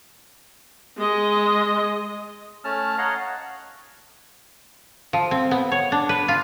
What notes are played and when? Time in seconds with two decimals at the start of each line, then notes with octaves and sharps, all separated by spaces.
0.97 G#3 D#5
2.64 A3 C#4 A5 F6
2.98 C#5 D#5 F5 F#5 A#5
5.13 F3
5.31 C4
5.51 B3
5.72 C#5
5.92 D4
6.09 B4
6.28 F4